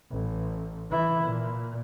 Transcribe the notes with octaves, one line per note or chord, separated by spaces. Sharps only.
A1
E3 E4
A#2